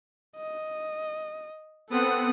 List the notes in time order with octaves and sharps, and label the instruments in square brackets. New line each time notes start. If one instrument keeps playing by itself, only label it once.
[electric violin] D#5
[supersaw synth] B3 C4 F#5 [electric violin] A4 D#6